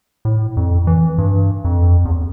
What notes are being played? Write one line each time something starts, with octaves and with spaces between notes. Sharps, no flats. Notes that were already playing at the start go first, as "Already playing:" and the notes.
A2
F2
E3
G2
F2
E2